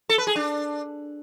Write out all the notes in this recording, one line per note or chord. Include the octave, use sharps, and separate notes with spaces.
A4
B4
G#4
D4